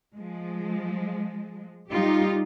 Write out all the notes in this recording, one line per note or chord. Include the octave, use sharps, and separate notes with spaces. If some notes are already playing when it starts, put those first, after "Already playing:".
F3 G#3
G3 D#4 F4 G4